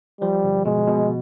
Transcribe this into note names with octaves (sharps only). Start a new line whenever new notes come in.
F3 G3
G1
B2 G#3
B2